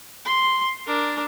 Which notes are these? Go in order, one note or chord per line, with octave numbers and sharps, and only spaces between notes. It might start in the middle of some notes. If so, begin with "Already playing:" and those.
C6
D4 A#4